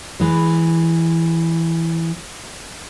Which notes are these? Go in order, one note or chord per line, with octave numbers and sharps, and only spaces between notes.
E3 G#3